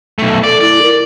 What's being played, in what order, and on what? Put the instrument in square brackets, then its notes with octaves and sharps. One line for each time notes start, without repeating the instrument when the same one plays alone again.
[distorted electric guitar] B1 A3
[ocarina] A4 [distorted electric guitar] D5
[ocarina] E4 [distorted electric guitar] D5
[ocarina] A#4